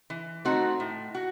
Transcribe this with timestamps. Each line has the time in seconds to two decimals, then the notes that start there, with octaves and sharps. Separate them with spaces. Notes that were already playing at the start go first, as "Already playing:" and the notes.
0.10 E3
0.45 A3 C4 D#4 F#4
0.80 A2
1.15 F#4